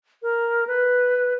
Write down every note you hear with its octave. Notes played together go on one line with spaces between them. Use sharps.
A#4
B4